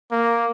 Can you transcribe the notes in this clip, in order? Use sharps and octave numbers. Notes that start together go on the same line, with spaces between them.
A#3